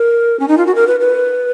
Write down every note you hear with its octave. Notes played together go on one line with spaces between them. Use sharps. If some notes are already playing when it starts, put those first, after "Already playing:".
Already playing: A#4
C#4
D#4
F4
F#4
A#4
B4
B4